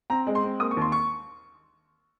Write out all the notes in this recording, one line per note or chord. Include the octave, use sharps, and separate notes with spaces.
C4 A#5
G#3
C6
C4
A#3 D#6
C#6
D#2 C6
C#6